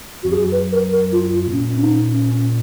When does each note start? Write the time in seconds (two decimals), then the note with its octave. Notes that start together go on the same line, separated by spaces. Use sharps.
0.23 F2 F#4
0.32 F#2 G#4
0.52 B4
0.72 A#4
0.92 A#4
1.12 F4
1.33 F4
1.47 B2
1.52 A#2 C#4
1.76 C#4
1.83 D#4
2.13 C#4